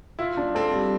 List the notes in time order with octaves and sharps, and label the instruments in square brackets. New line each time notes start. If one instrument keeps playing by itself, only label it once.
[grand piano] E4 [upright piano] F4
[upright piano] D4
[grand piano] C4 [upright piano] A4
[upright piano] G3